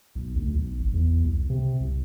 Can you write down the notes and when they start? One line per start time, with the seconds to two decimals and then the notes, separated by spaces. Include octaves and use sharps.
0.15 B1
0.36 D2
0.53 B1
0.80 G#1
0.93 E2
1.25 C2
1.50 C3
1.81 C2